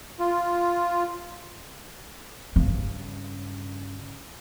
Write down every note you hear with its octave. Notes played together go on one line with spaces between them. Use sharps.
F4
G2 C#3